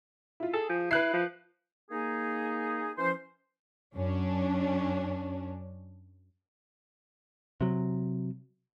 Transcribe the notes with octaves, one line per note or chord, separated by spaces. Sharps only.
E4 F4
G#4 A4
F3
E4 B4 F#6 C7
F3
A#3 D#4 G#4
E3 F3 C#4 C5
F#2 C#4 D4
C3 F#3